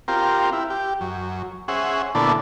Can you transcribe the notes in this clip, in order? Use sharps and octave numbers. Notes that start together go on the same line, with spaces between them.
C4 F4 G4 A#4
E4
G4
F#2
C#4 G#4 C5 E5 F#5
A#2 D3 B3 D4 E4 A4